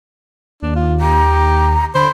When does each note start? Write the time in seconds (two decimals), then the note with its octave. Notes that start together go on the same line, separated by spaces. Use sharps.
0.62 D#2 D4
0.76 F4
1.01 G4 A#5
1.95 D3 C5 B5